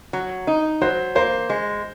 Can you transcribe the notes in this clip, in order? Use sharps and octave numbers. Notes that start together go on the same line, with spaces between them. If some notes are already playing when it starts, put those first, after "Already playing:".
F#3
D#4
F#3 C5
A#3 C5
G#3